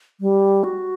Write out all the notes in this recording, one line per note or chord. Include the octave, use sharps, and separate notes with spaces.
G3
F#4